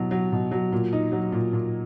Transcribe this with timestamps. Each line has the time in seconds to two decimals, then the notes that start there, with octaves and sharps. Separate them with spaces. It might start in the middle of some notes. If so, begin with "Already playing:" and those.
Already playing: B2 F#3 E4
0.11 F#3
0.32 B2
0.51 F#3
0.72 A#2
0.93 D#4
1.12 F#3
1.32 A#2
1.53 A#2